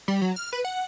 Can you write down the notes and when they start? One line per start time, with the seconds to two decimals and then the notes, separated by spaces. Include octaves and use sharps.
0.08 G3
0.22 F#3
0.36 F6
0.53 B4
0.65 F#5